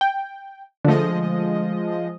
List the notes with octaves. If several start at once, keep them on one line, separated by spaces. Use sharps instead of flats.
G5
D3 F3 G#3 A3 D#5